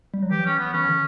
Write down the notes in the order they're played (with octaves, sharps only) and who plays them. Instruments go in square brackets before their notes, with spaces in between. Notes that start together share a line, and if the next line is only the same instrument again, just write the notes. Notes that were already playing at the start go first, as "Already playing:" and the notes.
[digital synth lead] G3
F#3
[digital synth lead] E3 [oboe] G4
[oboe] C#4
B3
[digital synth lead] E3 [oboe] C#4
[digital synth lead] D3